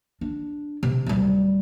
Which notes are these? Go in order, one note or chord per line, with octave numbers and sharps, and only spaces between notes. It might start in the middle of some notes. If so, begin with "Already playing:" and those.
D4
C3
D1 G3